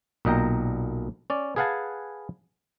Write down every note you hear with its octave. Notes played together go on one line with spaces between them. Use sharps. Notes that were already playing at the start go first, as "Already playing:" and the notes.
B1 A#2 D#5 G5 A#5
C#4 D5
G#4 B4 F5 F#5 G#5 A5